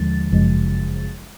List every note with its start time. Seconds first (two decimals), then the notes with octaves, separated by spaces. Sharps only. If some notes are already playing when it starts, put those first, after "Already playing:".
Already playing: D#2 D3 F3 G#3 A6
0.31 G1 F#2 C#3 F3 G#3